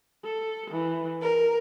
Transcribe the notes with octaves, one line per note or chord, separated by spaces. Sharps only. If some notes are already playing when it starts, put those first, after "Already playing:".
A4
E3
A#4